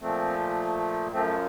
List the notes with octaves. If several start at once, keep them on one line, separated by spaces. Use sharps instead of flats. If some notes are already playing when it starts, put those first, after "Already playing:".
A#2 F3 A3 C4
F#2 F3 A3 C4